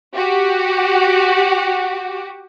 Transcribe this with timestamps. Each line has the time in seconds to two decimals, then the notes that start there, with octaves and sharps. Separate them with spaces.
0.14 F#4 G4